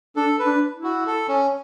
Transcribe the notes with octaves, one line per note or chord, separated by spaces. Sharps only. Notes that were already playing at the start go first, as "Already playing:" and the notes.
D4 A4
B4
D4
E4
F#4
A4
C#4